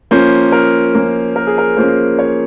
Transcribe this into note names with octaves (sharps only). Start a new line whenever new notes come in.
F3 A#3 C#4 C5
A#4
F3 A#3 C#4
A#4
G#4
A#4
F3 A#3 C#4 C5
C#5